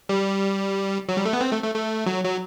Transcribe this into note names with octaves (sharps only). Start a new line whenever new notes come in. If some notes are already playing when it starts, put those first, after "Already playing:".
G3
F#3
G3
A3
B3
C4
A3
A3
A3
F#3
F#3